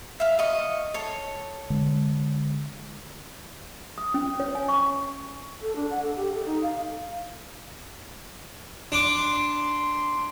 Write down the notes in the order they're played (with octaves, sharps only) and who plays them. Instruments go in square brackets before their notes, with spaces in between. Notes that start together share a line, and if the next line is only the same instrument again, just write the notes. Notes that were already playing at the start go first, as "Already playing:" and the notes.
[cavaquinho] E5 F5
D#5 C#6
A4 C#5
[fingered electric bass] D3 G#3
[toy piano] D#6
C#4
C#5
G#5
C#6
[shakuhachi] A4
D4
F#5
A4
G4
A4
D#4
F5
[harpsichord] D4 D6 [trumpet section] C6